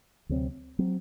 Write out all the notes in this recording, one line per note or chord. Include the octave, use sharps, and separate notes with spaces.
D2 C3 F#3 C4
F#3 C4